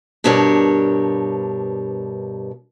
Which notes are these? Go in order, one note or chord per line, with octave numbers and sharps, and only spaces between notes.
G2 B2 D4 G4 A#4 C#5